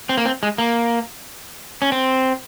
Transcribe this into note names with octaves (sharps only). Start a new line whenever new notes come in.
C4
A#3
C4
G#3
A#3
C#4
C4